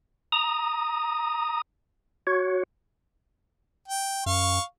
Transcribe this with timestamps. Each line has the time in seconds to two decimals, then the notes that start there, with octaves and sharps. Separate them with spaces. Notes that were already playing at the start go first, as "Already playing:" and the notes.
0.32 A#5 D#6
2.27 F#4 C#5
3.88 G5
4.26 F#2 F5 C#6